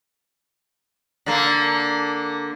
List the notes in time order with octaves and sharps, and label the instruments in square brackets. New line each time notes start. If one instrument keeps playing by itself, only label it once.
[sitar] D3 A#3